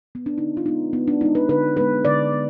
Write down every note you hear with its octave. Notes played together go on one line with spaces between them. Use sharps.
B3
D4
D3 D#4
F4
G#3 B3 D#4
D3 B3
D4
G#3 B3 D#4
B4
D3 B4
G#3 B3 B4
D3 D5
B3